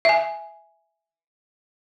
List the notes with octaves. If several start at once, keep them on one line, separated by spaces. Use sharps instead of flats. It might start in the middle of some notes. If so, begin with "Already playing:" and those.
E5 G#5